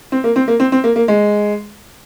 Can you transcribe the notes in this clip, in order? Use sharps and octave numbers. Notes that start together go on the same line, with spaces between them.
C4
A#3
C4
A#3
C4
C4
A#3
A#3
G#3